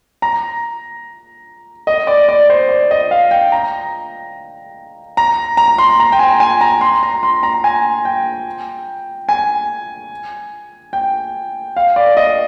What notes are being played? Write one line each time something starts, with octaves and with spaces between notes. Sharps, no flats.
A#5
D#5
D5
D5
C5
D5
D#5
F5
G5
A#5
A#5
A#5
C6
A#5
G5
G#5
G#5
A#5
C6
A#5
C6
A#5
G#5
G5
G#5
G5
F5
D5
D#5